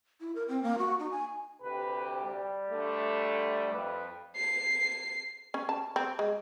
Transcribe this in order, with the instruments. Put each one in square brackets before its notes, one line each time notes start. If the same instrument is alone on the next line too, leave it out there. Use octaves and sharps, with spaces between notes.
[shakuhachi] E4
A#4
C4
A#3
F#4
D#4
G#5
[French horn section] D2 C3 G4 [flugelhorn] B4
[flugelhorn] G3
[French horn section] D2 D3 A3
[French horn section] F2 [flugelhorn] B4
[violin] C7
[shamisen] C#4
A5
C4
G#3